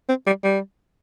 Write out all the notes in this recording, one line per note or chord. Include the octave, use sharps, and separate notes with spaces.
C4
G3
G3